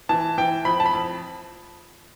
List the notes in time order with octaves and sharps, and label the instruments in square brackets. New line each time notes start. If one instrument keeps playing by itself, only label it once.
[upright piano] E3 A5
E3 G5
F2 B5
A5
B5
F2